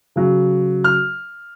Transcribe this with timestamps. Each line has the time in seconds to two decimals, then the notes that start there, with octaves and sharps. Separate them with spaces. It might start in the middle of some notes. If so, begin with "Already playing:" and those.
0.16 C#3 F#3
0.84 F6